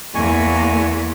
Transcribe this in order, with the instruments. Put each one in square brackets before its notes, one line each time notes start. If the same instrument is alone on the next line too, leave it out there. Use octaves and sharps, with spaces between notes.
[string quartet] E2 [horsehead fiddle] A#3 [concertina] G#5 C#6